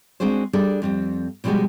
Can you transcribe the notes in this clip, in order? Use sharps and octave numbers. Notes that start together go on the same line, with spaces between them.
G#3 C4 D4 F#4 G#4 C5
G3 D4 G#4 A4 D5
F2 G3 C4
B2 F3 G3 G#3 F#4 G4